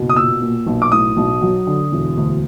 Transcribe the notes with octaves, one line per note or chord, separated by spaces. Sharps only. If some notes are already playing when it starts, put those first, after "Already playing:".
Already playing: F#1 B2
D#6
A#2 E6
A#2
B1
D6
A2 D#6
B1
F#3
D3
E1
D2